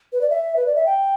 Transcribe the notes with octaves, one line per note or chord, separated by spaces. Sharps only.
B4
D5
E5
B4
D5
E5
G5